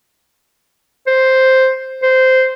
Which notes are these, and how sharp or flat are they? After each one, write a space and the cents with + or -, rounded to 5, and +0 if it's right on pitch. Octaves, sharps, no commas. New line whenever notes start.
C5 +0
C5 -10